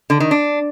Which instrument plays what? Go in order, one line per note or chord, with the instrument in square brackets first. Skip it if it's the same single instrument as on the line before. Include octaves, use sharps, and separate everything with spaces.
[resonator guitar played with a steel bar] D3
D#3
D4